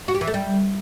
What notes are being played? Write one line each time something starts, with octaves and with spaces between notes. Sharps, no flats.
F#4
G4
E3
A3
G3